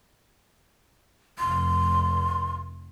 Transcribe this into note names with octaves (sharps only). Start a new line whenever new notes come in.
F1 C6